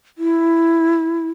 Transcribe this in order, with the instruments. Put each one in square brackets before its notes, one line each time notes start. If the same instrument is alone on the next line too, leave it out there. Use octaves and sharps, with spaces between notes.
[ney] E4